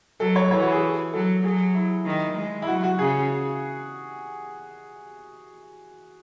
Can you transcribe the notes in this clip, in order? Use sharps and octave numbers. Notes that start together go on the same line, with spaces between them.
F#3 A4
C#5
E3 C#5
F#4
G#4
F#3 A4
F#3 G#4
E4
D#3
G#3
E4
F#3 F#4
F#4
C#3 G#4